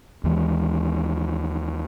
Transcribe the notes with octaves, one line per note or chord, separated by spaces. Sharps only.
D#2 E3 G#3